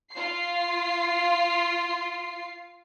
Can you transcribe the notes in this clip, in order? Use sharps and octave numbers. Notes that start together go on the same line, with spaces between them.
F4 C7